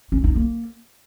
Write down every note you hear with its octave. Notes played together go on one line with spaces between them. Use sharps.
C#4
D#4
A#3